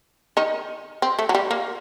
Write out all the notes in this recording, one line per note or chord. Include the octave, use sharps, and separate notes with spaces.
D#3 D#4
C4
A3
F#3
G3
A#3